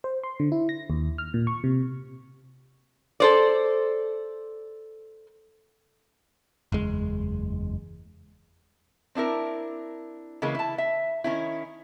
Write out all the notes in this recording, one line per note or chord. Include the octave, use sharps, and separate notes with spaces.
C5
C6
D3
E4
A#6
D#2
F6
A#2
C#6
C3
A4 C5 D5
F#1 E2 G#3
C4 D4 E4 A#4
C#3 E3 G#3 A#3
E4 A5
E5
D#3 C#4 E4